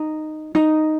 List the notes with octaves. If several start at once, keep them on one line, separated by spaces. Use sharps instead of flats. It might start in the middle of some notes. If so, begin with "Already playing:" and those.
Already playing: D#4
D#4